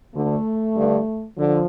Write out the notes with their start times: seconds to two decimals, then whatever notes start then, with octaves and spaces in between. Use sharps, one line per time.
0.14 D2 D3 A3
0.75 G2 D3
1.37 D3 F3